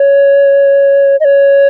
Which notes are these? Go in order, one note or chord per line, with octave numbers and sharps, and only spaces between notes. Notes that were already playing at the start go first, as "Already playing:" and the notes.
Already playing: C#5
D#5
C#5